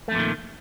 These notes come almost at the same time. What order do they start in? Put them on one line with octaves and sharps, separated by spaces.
A3 F2 A#2 D#3